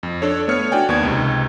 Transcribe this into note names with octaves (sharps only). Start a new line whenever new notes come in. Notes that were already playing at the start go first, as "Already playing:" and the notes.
F2
D4 A4 C#5
A3 B3 C#5 F6 C#7
D4 F#4 D5 G5 G#5
D#2 B3 C#6 G#6
C#2 C3 D#4